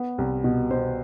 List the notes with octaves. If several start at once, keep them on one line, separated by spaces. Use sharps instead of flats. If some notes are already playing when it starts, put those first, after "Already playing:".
Already playing: B3
C2
B2
B2 C5